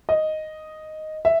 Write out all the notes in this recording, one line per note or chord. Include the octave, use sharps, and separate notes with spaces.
D#5
E5